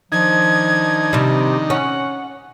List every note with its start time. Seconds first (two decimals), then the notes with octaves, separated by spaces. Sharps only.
0.12 D#3 F3 D4 D#4 G#6
1.13 C3 G3
1.70 C#4 F#5